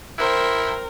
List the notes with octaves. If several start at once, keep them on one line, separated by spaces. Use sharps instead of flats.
E4 A#4 C5 G5